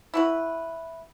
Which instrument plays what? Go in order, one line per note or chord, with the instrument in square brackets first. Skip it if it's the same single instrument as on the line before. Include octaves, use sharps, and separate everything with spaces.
[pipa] E4 F#4 B4